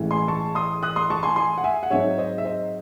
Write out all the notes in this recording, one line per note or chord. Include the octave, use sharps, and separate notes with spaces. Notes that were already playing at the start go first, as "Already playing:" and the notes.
Already playing: A1 A2 E3 G#3
G#5 C6
A5 C#6
C6 D#6
D#6 F#6
C6 D#6
A5 C#6
G#5 C6
G#5 C6
F#5
E5 G#5
F#5
G#2 F#3 C4 D#4 C#5 E5
C5 D#5
E5
C5 D#5